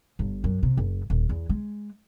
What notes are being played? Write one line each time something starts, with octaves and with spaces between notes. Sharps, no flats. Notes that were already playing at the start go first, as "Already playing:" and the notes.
G1
F#2
C3
F#1
D#1
E2
G#3